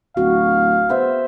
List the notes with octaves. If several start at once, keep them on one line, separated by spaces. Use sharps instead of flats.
D1 F#4 F5
B3 C5 E5